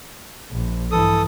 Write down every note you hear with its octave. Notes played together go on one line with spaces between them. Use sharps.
A#1
G2 E3 A4 D#6